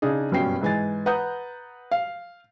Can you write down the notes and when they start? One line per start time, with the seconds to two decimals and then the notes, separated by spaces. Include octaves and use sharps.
0.02 C#3 D4 D#4 G#4
0.31 F#1 G2 B2 C#4 G5 C7
0.61 G#2 E3 G#5 A6
1.06 B4 F#5 A#5 D#6 G6
1.91 F5